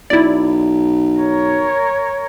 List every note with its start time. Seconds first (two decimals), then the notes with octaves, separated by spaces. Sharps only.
0.10 B1 E4 D5
1.19 A#4 C#5